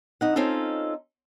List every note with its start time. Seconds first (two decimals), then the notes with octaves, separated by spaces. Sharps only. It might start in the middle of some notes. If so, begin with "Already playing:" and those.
0.21 F2 D#4 F#5
0.36 C4 C#4 D#4 F4 A4